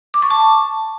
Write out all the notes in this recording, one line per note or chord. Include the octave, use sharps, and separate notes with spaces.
D6
C#6
A5